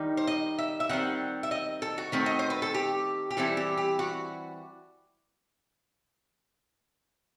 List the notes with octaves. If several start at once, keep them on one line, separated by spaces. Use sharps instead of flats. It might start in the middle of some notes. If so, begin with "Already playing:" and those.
Already playing: D#3 G3 D#4
C5
D#5
E5
E5
D#3 G3 C4 F#5
E5
D#5
A4
F#4
D#3 A3 C4
D#5
C5
B4
A4
G4
G4
E3 G3 C4 E4 A4
G4
G4
F#4